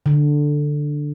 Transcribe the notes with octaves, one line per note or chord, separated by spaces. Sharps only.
D3